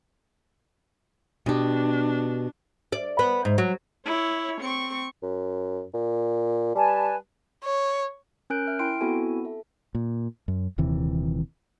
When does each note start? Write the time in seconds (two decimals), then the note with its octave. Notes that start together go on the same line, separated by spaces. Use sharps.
1.46 B2 D4 G4
2.92 D5
3.19 B3
3.45 G#2
3.58 F#3
4.06 E4 C#5
4.61 C4 C#6
5.23 F#2
5.94 A#2
6.75 G3 B4 G#5 A5
7.64 C#5
8.50 C#4 A#4 G#5 F#6 G6 D7
8.67 E5 F6
8.79 E4 G5 C6 D7
9.01 B3 C4 E4 F#4 A4 G#5
9.45 A4 E5
9.95 A#2
10.48 F#2
10.78 D#1 D#2 C3 E3